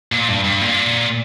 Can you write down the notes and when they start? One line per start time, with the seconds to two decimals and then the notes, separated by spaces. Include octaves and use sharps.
0.12 A#2
0.28 G2
0.44 G2
0.61 A#2